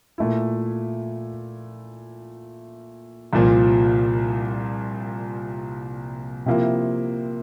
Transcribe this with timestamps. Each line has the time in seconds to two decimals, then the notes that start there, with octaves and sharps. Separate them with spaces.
0.18 A#2 A3 E4
3.33 C2 A#2 F3
6.46 C3 F3 A#3 E4